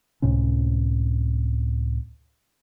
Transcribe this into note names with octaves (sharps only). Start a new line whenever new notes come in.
C#2 A2 C3 C#4